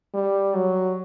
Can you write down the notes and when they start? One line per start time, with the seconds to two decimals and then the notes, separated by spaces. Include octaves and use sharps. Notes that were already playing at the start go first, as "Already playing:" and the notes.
0.14 G3
0.54 F#3